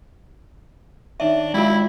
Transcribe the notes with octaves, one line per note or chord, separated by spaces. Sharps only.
D#3 D4 C#5 E5
F#3 G#3 E4 F4 F5 D7